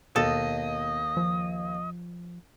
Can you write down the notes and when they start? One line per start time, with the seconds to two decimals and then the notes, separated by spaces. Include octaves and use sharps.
0.16 D#2 B2 A4 D#5
1.17 F3